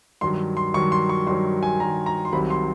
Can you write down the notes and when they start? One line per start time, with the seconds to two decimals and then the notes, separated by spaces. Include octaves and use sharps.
0.21 G2 D#3 F#3 C6
0.57 C6
0.74 G2 D#3 F#3 C#6
0.92 C6
1.09 C#6
1.27 G2 D#3 F#3 C6
1.63 G#5
1.80 G2 D#3 F#3 A#5
2.06 A#5
2.25 C6
2.33 C2 C3 D#3 F#3 B5
2.50 C6